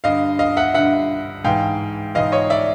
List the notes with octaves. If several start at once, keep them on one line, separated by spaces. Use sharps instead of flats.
G2 D3 D#5 F5
D#5 F5
E5 F#5
G2 D3 E5 F#5
G#2 E3 F5 G5
G#2 E3 D#5 F5
C#5 D#5
D5 E5